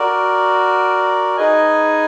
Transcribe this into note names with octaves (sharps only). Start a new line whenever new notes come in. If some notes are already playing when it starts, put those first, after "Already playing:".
Already playing: F#4 A#4 D5
D#4 G#4 B4 D#5 G#5